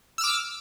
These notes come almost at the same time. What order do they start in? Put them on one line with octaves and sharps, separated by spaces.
E6 F6 D6